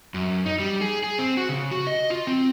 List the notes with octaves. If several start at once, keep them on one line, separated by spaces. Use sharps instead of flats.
F#2
D#4
G3
G#4
G#4
C4
F#4
C#3
F#4
D#5
F4
C4